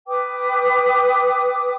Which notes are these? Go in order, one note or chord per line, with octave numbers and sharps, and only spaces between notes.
B4 G5 D6 D#6